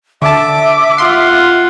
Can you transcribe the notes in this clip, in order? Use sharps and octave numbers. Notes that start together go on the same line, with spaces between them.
D3 E5 A5 D6
F4 F#5 C6